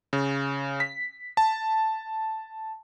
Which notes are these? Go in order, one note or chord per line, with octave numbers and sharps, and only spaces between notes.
C#3
B6
A5